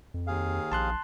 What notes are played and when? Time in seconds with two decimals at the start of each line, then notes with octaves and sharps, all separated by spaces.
0.14 F2
0.27 D#2 G#4 F5
0.72 A#1 A5 C6 F#6